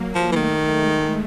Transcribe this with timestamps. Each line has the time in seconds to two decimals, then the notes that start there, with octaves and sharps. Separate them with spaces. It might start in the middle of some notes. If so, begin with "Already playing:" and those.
Already playing: F#3 A#3
0.15 F3
0.32 E3
0.35 D#3 A3
0.78 G#3